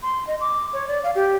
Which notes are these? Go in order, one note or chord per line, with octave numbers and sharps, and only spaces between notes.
C6
D#5
D6
C#5
D5
F5
G4